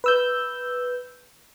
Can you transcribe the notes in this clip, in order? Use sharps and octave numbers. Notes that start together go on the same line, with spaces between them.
B4 E6 G6